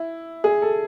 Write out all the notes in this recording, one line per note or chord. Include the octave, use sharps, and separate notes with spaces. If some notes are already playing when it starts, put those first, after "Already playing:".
Already playing: E4
G#4
A4